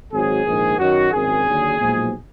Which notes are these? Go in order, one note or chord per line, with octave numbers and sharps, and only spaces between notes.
G#1 G#2 F#3 G#4
A#1 G#2 D#3
F#2 D#3 F#3 F#4
G#1 F#2 D#3 G#4
D#2 D3 F#3
B1 A#2 F3 G#3